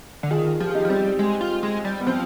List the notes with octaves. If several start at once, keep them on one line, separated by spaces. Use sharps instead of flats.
D3
D#3 F4 G#4
F3 G4
G#4
D#4 G4
F3
G3 C4
G#3
F4
G#3
G3
B3
F3 C4